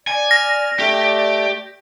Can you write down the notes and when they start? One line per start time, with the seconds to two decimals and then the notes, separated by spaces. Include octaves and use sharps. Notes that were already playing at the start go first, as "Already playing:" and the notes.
0.07 D5 G#5
0.31 F6 A#6
0.79 A3 G4